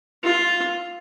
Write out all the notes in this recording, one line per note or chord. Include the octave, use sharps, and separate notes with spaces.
F4